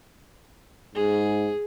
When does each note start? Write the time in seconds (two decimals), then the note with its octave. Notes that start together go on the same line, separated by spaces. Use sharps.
0.95 G#2 G#4